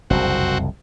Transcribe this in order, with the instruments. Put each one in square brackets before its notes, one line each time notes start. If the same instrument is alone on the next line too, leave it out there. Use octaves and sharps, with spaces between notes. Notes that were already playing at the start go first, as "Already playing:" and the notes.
[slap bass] F#1 C2 F2 [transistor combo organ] C4 F#4